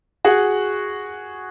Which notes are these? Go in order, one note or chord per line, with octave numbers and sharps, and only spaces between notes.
F#4 G#4